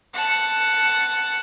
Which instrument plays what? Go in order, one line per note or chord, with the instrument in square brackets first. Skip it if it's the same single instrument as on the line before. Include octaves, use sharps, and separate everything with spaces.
[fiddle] F#5 A5